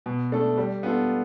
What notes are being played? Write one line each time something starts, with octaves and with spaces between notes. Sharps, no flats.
B2
A3 D4 A4
G3
B3 D4 F4 A4